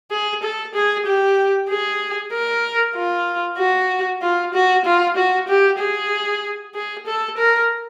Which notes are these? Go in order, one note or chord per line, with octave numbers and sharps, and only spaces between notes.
G#4
A4
G#4
G4
G#4
A#4
F4
F#4
F4
F#4
F4
F#4
G4
G#4
G#4
A4
A#4